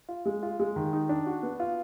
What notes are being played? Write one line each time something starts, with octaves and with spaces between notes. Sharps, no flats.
F4
G#3
F4
G#3
D#3
D#4
D4
F#4
B3
F4